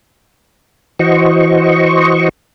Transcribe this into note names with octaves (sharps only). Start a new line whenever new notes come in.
E3 F#4 C5 D#5 C#6